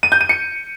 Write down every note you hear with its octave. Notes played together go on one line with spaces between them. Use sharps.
D#7
G6
D#7
C#7